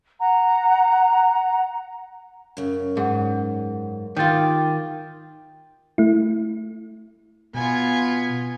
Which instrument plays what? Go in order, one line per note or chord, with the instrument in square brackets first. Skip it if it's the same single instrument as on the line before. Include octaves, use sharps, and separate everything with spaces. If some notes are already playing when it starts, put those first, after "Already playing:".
[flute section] F#5 A#5
[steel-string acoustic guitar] F#2 C#3
[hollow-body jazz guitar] G#2 [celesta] G#4 F#5
[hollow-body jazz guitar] D#3 F4 [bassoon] G4 [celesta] G6 A6
[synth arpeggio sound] A3 E4
[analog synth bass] B2 [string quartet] B3 F4 [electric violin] G#5 G#6